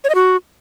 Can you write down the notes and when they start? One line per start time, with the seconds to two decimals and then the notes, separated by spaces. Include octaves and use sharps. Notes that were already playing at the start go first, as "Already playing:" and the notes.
0.04 C#5
0.09 D#5
0.15 F#4